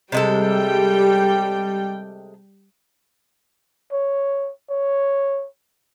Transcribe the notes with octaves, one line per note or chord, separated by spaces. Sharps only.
C3 G3 G#3 A4 G5
C#5
C#5